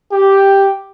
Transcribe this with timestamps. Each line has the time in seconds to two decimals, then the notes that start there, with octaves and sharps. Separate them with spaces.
0.12 G4